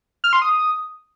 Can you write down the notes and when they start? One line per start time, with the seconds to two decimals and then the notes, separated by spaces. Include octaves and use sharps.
0.24 F6
0.33 C6
0.42 D#6